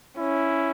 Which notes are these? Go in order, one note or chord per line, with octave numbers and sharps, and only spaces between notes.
C#4 E4